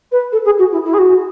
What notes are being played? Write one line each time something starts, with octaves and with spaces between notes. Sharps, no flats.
B4
A4
G#4
F#4
E4
E4
G#4
F#4